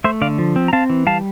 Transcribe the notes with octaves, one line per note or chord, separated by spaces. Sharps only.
A3 C5 E5
D3 D5 F5
F3
C4
A#5
C4 F5 A5
E3
G3 F5 A5